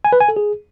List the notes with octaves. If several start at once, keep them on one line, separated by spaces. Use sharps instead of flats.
G#5
B4
G#5
A4
G#4